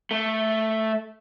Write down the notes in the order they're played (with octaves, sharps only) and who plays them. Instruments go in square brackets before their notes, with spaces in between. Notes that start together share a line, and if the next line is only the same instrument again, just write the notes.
[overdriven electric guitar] A3